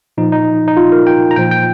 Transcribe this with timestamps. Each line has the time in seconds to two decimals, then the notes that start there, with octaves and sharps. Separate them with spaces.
0.18 A#2 F3 D#4
0.32 D#4
0.68 D#4
0.77 F4
0.92 A#4
1.07 G5
1.31 A#5
1.36 A#2 F3 G5
1.51 G5